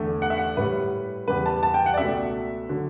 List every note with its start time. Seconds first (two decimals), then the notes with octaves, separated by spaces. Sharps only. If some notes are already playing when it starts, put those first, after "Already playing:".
Already playing: E2 D3 A3
0.22 F#5
0.30 E5
0.38 F#5
0.57 A2 G3 B4
1.28 E2 C#3 G3 B4
1.46 A5
1.63 A5
1.74 G5
1.86 F#5
1.94 D5
1.97 C#2 B2 A3 E5
2.69 D3 F#3